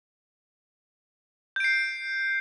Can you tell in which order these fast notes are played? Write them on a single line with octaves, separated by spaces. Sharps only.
G6 D7 C7